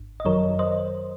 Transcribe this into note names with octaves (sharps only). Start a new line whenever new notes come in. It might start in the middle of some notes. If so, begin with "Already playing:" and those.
Already playing: G#1
D#5
F#2 D#3 F#3 A#4 C#5
C5 D#5